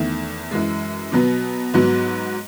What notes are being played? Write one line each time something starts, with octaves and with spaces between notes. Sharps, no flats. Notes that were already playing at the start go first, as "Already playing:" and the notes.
Already playing: E2 D#3 A3
F#2 E3 G#3
B2 F#3 B3
G#2 F#3 B3